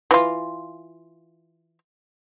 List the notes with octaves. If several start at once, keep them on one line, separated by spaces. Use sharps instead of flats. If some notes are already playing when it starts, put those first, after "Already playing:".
E3 F4